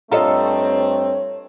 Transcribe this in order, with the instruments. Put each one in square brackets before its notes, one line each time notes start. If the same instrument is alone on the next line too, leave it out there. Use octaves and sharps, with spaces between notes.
[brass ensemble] G2 A3 C4 [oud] F4 A4 [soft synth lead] C#5 [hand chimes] D#5 A#5